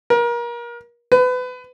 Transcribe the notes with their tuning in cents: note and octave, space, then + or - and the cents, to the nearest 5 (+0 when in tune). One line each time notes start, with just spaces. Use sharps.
A#4 +30
B4 +30